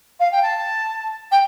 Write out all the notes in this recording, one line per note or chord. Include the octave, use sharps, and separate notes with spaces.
F5
G5
A5
G5